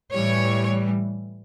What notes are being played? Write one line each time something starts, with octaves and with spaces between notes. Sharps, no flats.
A2 E3 G3 C#5